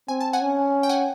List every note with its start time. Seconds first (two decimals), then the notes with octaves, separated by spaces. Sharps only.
0.08 C4 G#5
0.21 A5
0.33 F#5 G#5
0.41 C#4
0.83 G5
0.89 F#5 G#5